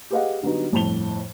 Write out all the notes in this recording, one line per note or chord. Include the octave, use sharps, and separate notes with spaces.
G4 G#4 B4 D#5 F5 F#5
D3 F#3 G3 B3 D#4
G1 F2 A2 A5 F7 G7